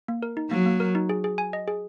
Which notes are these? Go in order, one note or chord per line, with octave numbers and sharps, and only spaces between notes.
A#3
A#4
D#4
F#3 A#3
A#3
A#4
D#4
G#4
G#4
G#5
D#5
G#4